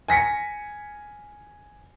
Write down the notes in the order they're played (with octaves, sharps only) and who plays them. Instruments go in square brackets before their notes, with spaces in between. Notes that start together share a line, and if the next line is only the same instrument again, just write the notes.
[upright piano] G#5 A#6 B6 C#7